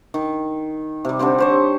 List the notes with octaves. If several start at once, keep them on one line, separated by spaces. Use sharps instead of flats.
D#3
C3 G3
D3 G3 C4 G4
G4 C5 C#5